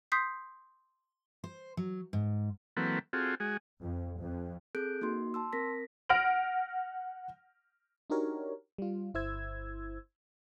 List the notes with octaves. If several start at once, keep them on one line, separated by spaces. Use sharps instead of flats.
C6 D#6 G6 B6 C7
C5
F#3
G#2
E3 F#3 A#3 C4 A4 B4
C4 F4 F#4 G#4 A4
G#3 F#4 G#4
F2
F2
C4 G#4 A4 F#6 G6 D7
A#3 D#4 F#4 C6
A5 C6 E6
C4 A#4 A#6 B6
F#5 F6 A#6 D7 F#7
D4 D#4 F#4 G4 A#4 C#5
G3 F4
G1 E4 C5 E6 G#6